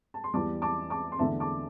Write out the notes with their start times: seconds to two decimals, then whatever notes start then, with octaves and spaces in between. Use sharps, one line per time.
0.14 A5
0.24 C6
0.34 E2 E3 G3 A5 D6
0.62 A5 D6
0.90 A5 D6
1.12 C6
1.19 E2 D3 A3 E5 A5
1.40 A5 D6